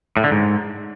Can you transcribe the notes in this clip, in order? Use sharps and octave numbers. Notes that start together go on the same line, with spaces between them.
A2
D3
G#2